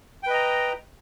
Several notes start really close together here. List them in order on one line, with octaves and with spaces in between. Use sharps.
G5 B4 D#5 A#5